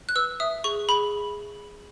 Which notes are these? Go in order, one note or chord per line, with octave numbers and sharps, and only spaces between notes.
F#6
B4 E6
E5 D#6
G#4 C#6
G#4 B5